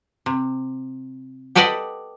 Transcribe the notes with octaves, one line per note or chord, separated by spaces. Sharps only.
C3
G4 A4 B4 D5 D#5 F#5